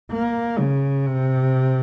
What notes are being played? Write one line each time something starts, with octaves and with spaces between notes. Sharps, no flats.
A#3
C#3
C3